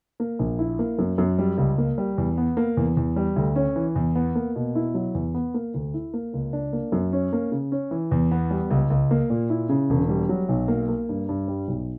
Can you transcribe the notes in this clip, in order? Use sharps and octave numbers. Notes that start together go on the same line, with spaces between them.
A#3
A#1
E4
A#3
F#2
F#2
G3
C#2
A#3
G3
E2
B3
A#3
E2
E2
G3
D2
C#4
E3
E2
B3
A#3
B2
E4
F#3
E2
B3
A#3
D2
E4
A#3
C#2
D4
A#3
F#2
C#4
A#3
C#3
C#4
E3
E2
B3
G3
C#2
C#2
A#3
A#2
E4
C#3
E1
G3
F#3
B1
A#3
A#3
G2
G2
G3
B1